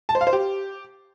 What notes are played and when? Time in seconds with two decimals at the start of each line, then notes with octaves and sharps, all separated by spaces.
0.09 A5
0.15 C5
0.21 F5
0.27 C5
0.33 G4